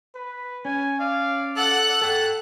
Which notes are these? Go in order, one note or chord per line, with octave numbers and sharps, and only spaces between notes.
B4
C#4 G#5
D5 F5
A4 F#5 F#6
A4 G5 A5